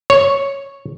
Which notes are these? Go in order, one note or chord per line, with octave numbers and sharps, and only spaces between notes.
C#5